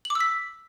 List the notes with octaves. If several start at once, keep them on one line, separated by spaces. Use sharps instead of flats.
F#7
D6
E6
B6